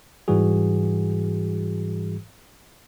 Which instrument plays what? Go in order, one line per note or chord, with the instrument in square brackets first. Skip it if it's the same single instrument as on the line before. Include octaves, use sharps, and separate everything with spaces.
[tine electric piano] G#2 E3 G3 F#4 G#4